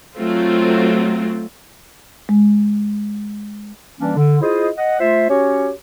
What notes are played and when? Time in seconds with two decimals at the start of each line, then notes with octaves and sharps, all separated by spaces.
0.17 F#3 A3 C4 F4
2.29 G#3
4.00 E3 G3 A#3 C#4 D4
4.16 D3
4.41 E4 F4 G#4 C5 D#5
4.77 D#5 F#5
4.99 A3 F4 C5 E5
5.29 C#4 F#4 G4 C#5